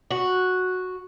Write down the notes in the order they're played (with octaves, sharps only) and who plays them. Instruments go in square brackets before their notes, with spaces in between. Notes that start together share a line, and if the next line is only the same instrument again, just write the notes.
[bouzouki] F#4